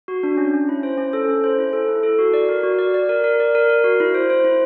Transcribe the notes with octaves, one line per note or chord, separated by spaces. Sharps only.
F#4
D4
C#4
C#4
E4
C5
C#4
A4
C#4
C5
E4
A4
E4
A4
F#4
D5
A#4
F#4
D5
D5
A#4
A#4
D5
A#4
A#4
F#4
E4
C5
C5
E4